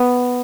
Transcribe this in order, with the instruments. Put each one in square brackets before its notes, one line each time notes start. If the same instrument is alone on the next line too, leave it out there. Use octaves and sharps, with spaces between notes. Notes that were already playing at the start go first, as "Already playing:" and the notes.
Already playing: [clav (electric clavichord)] B3